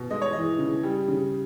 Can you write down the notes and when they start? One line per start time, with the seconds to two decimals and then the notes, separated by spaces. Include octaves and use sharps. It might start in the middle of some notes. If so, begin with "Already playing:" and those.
Already playing: B2
0.10 G#3 D#5
0.22 C#5
0.33 E3 D#5
0.59 C#3
0.83 G3
1.08 C#3